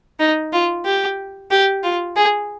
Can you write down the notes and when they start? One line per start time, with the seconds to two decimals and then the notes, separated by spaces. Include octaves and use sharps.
0.20 D#4
0.53 F4
0.86 G4
1.51 G4
1.83 F4
2.16 G#4